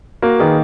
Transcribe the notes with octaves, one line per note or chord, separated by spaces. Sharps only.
A#3 F#4 A#4
D#3 G#4 B4